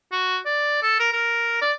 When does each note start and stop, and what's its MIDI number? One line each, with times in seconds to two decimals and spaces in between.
0.12 0.37 66
0.45 0.79 74
0.82 0.95 69
0.99 1.10 70
1.12 1.60 70
1.61 1.72 74